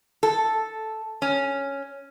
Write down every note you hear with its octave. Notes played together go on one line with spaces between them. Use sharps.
A4
C#4